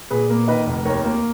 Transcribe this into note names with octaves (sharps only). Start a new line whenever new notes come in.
A#2 G#4 B4
A#3
D#3 B4 D#5
F1
D#2 A#4 C#5
A#3